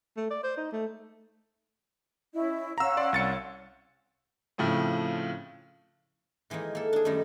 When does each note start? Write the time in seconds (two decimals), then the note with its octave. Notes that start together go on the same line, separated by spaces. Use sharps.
0.17 A3
0.30 D5
0.43 C5
0.57 D#4
0.72 A3
2.34 C#4 E4 D#5
2.78 C#4 F5 F#5 A#5 E6
2.97 D5 C6
3.13 C2 A6 C#7
4.58 A2 C#3 F3 A3 C4
6.50 D#3 E3 G#3 A#3 D#4
6.75 A#3 A4
6.93 D4 G#4
7.05 F#2 D#3 G3 A3 D#4